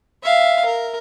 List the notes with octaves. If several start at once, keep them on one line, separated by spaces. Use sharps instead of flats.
E5 F5
A#4